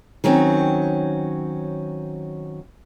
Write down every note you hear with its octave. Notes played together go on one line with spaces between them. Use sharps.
D#3 F#3 C4 C#4